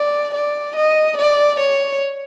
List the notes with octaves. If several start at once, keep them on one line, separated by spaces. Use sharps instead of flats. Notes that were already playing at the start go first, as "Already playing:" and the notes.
Already playing: D5
D5
D#5
D5
C#5